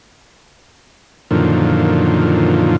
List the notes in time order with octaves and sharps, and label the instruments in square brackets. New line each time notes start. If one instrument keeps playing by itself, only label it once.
[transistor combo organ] F#2 A#2 D3 D#3 F3